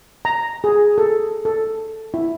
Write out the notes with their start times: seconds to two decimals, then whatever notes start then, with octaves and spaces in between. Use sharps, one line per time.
0.25 A#5
0.64 G#4
0.98 A4
1.45 A4
2.14 E4